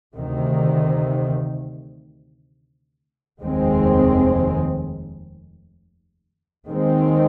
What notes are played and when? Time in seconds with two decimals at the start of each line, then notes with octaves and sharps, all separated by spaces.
0.15 D2 C3 D#3
3.41 F1 D#2 D#3 G#3 C4
6.67 D#2 D#3 G#3 C4